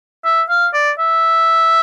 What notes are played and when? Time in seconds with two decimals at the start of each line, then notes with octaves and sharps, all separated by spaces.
0.25 E5
0.50 F5
0.74 D5
0.99 E5